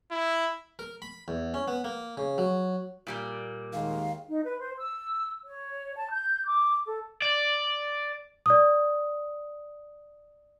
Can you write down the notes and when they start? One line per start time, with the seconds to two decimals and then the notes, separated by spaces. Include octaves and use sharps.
0.11 E4
0.79 A#4
1.02 B5
1.28 E2
1.54 C#4
1.68 B3
1.84 A#3
2.17 C#3
2.38 F#3
3.07 A#2 G3 A#3
3.73 D#2 D#3 G#3 F5
4.29 D#4
4.44 B4
4.59 C5
4.77 E6
5.45 C#5
5.96 A5
6.11 G6
6.46 D6
6.86 A4
7.22 D5
8.46 D5 D#6